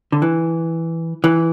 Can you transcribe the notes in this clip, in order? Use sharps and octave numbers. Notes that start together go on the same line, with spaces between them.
D3
E3
E3